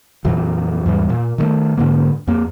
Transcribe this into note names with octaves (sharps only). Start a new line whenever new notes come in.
F2 A#2 E3 F#3
E2 G#2 E3 G3
A#2
D#3 F#3 A3
G#2 D3 A#3
F2 A#3